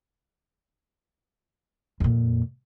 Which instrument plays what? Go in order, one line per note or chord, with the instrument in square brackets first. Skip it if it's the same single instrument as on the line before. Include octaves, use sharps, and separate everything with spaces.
[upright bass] F2 A#2